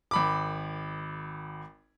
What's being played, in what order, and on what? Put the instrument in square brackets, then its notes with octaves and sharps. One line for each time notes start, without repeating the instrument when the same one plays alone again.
[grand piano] G#1 B5 D6